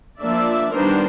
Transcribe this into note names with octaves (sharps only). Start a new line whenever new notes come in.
F3 A#3 D4 D5 E5
D#3 G3 B3 D4 A#4 C5